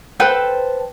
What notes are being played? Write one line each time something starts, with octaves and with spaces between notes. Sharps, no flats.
A4 B4 C5 G5